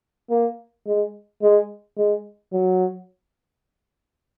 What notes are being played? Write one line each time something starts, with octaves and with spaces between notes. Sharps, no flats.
A#3
G#3
G#3
G#3
F#3